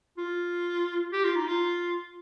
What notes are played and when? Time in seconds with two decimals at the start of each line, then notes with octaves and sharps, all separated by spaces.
0.18 F4
1.12 G4
1.24 F4
1.36 D#4
1.48 F4